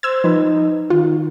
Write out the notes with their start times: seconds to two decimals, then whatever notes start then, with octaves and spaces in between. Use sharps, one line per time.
0.03 C5 E6 G#6
0.24 F3 D#4 B4
0.90 D#3 F4